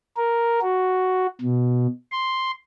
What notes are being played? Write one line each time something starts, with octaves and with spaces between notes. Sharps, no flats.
A#4
F#4
B2
C6